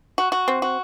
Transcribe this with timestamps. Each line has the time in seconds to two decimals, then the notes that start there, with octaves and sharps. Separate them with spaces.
0.18 F#4
0.32 F#4
0.48 C4
0.62 F#4